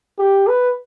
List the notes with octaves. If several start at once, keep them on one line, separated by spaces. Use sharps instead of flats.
G4
B4